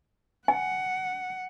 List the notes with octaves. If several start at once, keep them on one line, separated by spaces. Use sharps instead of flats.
F#5 G#5